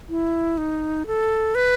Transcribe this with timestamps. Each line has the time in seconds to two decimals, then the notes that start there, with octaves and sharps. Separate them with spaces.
0.09 E4
0.58 D#4
1.07 A4
1.55 B4